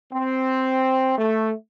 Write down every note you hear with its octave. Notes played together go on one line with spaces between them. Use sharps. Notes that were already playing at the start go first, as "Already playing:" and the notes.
C4
A3